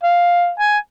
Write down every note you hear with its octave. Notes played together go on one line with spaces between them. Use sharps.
F5
G#5